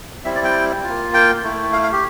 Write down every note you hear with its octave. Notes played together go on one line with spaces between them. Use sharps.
G3 C4 E4 E5
D5
G5
A#3 F4
G5
A3 E4
F5
F5
G4